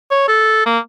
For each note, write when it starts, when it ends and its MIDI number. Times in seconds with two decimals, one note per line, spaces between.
0.11 0.24 73
0.28 0.63 69
0.66 0.79 58